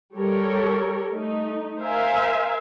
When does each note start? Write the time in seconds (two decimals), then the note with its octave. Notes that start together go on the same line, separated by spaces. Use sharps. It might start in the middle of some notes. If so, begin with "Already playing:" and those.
0.16 G3 G4 A4 A#4 C#5
1.11 A3 D#4
1.80 A#4 C5 E5 F5 G#5